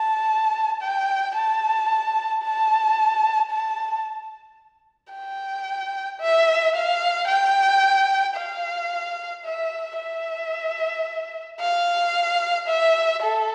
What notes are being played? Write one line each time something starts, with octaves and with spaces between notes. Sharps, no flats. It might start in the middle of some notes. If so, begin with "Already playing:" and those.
Already playing: A5
G5
A5
A5
A5
G5
E5
F5
G5
F5
E5
E5
F5
E5
A4